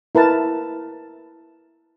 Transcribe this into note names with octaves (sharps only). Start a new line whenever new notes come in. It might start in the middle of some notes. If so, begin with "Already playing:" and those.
E4 A#4 B4 A5